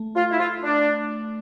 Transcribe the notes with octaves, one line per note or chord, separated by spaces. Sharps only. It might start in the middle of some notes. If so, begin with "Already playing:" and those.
Already playing: A3
F4
E4
F4
D4